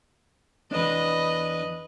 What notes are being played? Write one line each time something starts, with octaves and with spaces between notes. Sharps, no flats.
E2 D4 B4 D#5